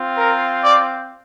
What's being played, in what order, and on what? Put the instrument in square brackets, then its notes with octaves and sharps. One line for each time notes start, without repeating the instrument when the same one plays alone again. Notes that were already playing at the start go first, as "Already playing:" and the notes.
Already playing: [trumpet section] C4 F4
A#4
D5